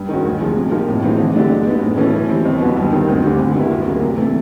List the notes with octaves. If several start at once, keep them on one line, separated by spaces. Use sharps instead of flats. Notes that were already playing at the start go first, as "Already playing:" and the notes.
Already playing: G2
D#3 G#3 C#4 F#4
D2
C3 F3 G#3
C3
F3 A#3 D#4 G4
A2
E3 G#3 C4 D#4
D3
F#3 A3 D4 G4
G#3
B3 D#4
A2
E3 A3 C#4
E3
G3 C4
D#2
D3 F#3 B3
G2
D#3 G3 C4 D#4
D2
D3 G3 C4
G#2
D#3 G3 B3 E4
D2
C#3 F#3 A#3
C3
E3 A3